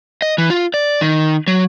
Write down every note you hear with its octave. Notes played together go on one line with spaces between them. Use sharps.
D#5
E3
F4
D5
D#3
F#3